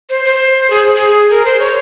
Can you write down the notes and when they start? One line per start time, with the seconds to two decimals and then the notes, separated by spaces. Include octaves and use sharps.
0.10 C5
0.25 C5
0.70 G#4
0.96 G#4
1.30 A#4
1.45 C5
1.59 C#5